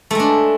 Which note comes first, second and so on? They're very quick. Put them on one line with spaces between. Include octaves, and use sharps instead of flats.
A3 G#3 D4